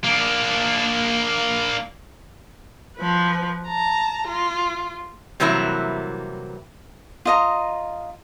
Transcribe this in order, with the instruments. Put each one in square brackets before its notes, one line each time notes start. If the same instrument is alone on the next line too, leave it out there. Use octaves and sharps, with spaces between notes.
[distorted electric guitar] A#3 D4
[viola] F3 B4
A5 A#5
F4
[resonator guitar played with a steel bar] C3 E3 F#3 G3 A#3 E4
[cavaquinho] F4 D#5 A#5